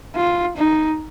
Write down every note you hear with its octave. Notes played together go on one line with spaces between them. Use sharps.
F4
D#4